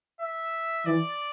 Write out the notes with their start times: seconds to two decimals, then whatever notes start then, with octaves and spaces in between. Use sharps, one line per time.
0.21 E5
0.86 E3 D5